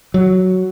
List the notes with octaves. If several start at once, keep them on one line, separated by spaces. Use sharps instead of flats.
F#3